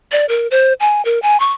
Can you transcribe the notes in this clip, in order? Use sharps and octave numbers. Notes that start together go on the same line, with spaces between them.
D5
A#4
C5
G#5
A#4
G#5
C#6